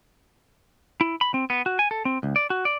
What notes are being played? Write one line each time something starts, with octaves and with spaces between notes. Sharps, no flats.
E4
B5
C4
B3
F#4
G#5
A4
C4
C#2
D5
F#4
D5